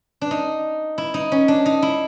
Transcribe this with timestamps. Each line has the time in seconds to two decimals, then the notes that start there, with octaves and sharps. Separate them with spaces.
0.21 D4
0.31 D#4
0.98 E4
1.14 D#4
1.32 C#4
1.48 D4
1.66 D#4
1.82 E4